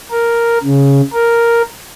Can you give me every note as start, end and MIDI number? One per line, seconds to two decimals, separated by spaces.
0.11 0.58 70
0.64 1.01 49
1.13 1.62 70